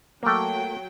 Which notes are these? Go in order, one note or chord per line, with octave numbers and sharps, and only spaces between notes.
F#3 A3 A#3 G5